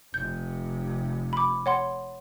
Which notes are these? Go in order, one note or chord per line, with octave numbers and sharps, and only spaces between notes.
F1 C3 G6
B5 D6
C#5 F#5 C6